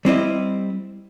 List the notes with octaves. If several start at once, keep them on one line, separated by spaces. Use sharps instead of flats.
G3 C4 E4 D#5